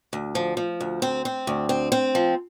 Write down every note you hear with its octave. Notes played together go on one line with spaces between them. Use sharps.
D2
F3
F3
D2
C4
C4
D2
C4
C4
F3